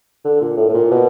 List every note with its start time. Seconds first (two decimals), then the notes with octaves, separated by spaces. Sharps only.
0.24 D3
0.41 A#2
0.57 A2
0.69 A2
0.74 A#2
0.91 B2